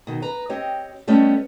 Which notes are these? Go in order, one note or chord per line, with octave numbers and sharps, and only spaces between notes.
B2 D#3
B4 A#5
C4 G4 C#5 D#5
G3 A3 B3 C#4 D#5